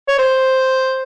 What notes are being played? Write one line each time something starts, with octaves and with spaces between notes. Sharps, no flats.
C#5
C5